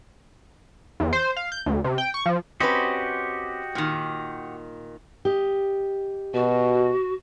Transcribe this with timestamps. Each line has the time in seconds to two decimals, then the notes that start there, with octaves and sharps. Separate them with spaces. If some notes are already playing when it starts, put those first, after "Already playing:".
1.00 E2
1.13 C5
1.36 F5
1.52 G6
1.66 D2
1.84 C3
1.98 G5
2.14 C#6
2.26 F3
2.60 C4 C#4 F#4 G4 B4 D#5
3.75 A#2 D#3
5.25 G4 D#5
6.34 B2 F#4